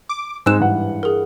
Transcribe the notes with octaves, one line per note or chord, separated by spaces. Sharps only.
D6
G#2 G#3 C4 D#4 E6 F#6 E7
G2 E3 F#5
G#4 A#4